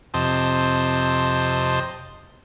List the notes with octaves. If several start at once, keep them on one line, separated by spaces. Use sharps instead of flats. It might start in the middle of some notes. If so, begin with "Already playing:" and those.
F2 C3 C5 D#5 A5